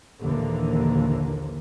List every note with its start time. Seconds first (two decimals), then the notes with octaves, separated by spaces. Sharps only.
0.21 A#1 D#2 D3 E3 F3 A#3